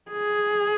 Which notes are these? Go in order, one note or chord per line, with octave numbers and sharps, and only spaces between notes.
G#4